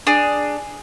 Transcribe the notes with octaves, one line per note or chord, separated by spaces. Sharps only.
D4 G#4